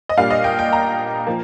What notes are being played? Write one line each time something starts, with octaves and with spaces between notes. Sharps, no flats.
D#5
A#2 G3 D4 F5
D#5
G5
G5
A#5
F3 A#3